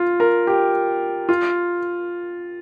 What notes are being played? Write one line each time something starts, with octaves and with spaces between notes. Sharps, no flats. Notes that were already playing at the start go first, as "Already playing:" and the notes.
Already playing: F4
A#4
G4
F4